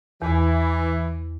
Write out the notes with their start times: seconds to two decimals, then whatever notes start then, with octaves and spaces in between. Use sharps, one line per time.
0.22 E2 E3